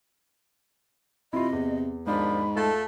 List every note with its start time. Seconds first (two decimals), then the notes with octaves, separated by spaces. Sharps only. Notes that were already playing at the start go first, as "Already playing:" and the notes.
1.33 C3 E4 F4 D#5
1.53 E2
2.07 D#2 G#2 F3 D4 B5
2.56 A3 F4 A4